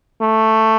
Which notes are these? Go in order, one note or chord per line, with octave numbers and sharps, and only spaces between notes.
A3